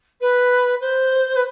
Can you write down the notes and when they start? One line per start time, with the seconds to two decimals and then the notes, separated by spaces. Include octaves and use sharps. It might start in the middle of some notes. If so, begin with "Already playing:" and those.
0.21 B4
0.80 C5
1.36 B4